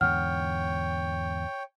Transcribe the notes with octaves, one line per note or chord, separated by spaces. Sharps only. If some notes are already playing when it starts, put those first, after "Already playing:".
E2 G#2 D3 C#5 F#5 G5 F6